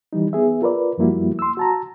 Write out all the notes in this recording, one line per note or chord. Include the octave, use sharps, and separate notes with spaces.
E3 G3 D#4
B3 G#4 E5
F4 A#4 B4 D5
F#2 F3 G3 A#3 E4 F#4
C6 E6
F#4 A5 A#5